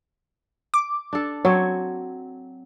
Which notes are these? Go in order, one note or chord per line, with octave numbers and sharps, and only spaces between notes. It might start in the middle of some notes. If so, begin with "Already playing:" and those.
D6
D4 A4
F#3 C4 C#5